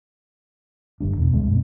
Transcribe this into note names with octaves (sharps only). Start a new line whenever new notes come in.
G1 G3 D4
E2 B2
D1 D2 G#3 C4
F#2 B2